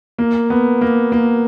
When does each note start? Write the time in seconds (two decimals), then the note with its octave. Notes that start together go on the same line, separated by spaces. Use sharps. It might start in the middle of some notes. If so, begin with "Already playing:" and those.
0.18 A#3
0.50 B3
0.81 A#3
1.12 A#3